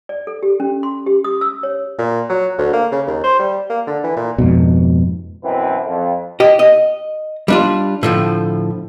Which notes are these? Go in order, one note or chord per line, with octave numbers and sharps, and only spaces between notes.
D5
A4
G4
C#4
C6
G4
D#6
E6
C#5
A#2
F#3
D2
A#3
C#3
D#2
C5
G3
A#3
D3
E3
A#2
F2 G#2 B2
F#2 B2 E3 C4 B4
F2
G4 D#5
D#5
G3 D4 F4
A2 D3 F3